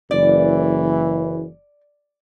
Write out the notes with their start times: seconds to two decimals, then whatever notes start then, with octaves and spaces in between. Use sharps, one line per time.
0.11 F#1 E3 D5